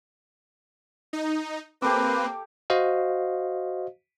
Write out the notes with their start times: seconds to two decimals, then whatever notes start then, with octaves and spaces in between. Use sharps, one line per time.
1.13 D#4
1.82 A#3 C4 G4 A4 B4 D6
2.70 F#4 C5 D#5 F5